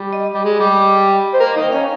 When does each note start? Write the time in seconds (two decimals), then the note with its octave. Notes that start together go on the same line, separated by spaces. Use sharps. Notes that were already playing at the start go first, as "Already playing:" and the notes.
Already playing: G3
0.13 D#5
0.33 G3
0.45 G#3
0.60 G3 G4
1.09 D#5
1.34 C5
1.40 A#3 A#4
1.56 D#3 D#4
1.62 G5
1.72 C#4 F5